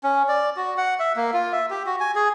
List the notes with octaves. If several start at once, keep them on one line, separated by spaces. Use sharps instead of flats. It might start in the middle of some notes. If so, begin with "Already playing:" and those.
C#4
D5
F#4
F#5
E5
A#3
F4
E5
G4
F#4
G#5
G#4